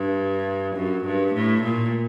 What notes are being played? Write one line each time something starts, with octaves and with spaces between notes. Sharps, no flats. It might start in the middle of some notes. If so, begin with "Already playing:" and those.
Already playing: G2
F#2
G2
A2
A#2